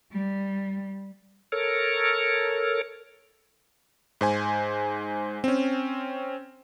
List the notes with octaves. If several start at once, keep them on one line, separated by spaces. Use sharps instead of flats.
G3
A4 A#4 C#5
G#2 C5 G#5
C4 C#4